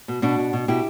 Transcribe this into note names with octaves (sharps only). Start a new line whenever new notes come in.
B2
B2 D4 F#4
B2
B2
B2 E4 G4